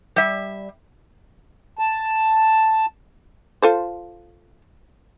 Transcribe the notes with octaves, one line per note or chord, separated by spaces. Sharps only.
G3 E5
A5
F4 A4 C5